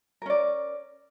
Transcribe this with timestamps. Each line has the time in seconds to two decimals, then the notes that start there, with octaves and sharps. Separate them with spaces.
0.22 A#4
0.26 C#4
0.30 D5